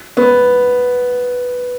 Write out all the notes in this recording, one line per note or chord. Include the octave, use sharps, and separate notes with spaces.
B3